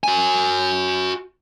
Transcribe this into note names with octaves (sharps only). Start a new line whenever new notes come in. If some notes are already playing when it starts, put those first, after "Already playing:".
F#4 G#5